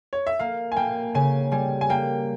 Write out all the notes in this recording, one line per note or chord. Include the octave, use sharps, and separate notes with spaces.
C#5
E5
A#3 F5
G#5
A#3 G5
C#3 G#5
G3 G#5
G#5
A#3 G5